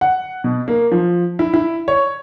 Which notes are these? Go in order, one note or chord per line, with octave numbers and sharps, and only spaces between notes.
F#5
B2
A#3
F3
E4
E4
C#5